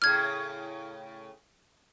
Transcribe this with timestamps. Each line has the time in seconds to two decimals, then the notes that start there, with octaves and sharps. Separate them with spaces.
0.02 A2 C#3 F6 G#6